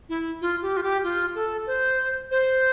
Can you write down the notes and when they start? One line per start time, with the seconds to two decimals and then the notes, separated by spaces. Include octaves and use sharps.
0.09 E4
0.41 F4
0.62 G4
0.77 F4
0.83 G4
1.04 F4
1.35 A4
1.67 C5
2.31 C5